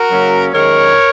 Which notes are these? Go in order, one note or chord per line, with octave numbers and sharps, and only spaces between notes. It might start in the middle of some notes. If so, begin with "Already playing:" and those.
Already playing: F#4 A#4
F#2 C#3 F#3 A#3 C#4
F#2 D#3 G#3 A#4 C#5